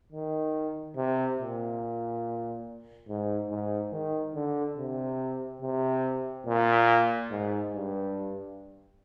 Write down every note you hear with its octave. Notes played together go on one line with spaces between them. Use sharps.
D#3
C3
A#2
G#2
G#2
D#3
D3
C3
C3
A#2
G#2
G2